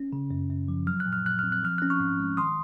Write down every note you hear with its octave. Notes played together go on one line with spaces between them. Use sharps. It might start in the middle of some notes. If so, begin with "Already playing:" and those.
Already playing: C#4
C#3
F#2
F#2
F3
F#3 F6
F#6
A#2
F6
A#2 F#6
C4 F6
F#6
F3 F6
C#4 F#6
C#6 F6
G#2
G#3
D#3 C6 D#6